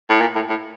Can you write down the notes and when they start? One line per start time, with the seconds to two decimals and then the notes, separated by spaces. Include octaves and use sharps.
0.09 A2
0.21 A#2
0.35 A2
0.49 A2